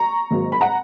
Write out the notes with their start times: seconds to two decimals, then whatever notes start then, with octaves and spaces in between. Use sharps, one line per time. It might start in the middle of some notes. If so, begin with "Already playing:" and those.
Already playing: A#5 C#6
0.31 G#1 G#2 F#3 A#3
0.52 B5
0.61 F#5 A#5